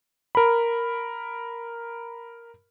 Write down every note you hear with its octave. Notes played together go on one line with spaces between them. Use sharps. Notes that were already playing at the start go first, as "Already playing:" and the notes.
A#4 B5